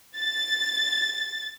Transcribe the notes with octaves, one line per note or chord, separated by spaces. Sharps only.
A6